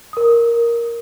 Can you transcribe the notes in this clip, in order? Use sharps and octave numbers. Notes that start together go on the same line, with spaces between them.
A#4 D#6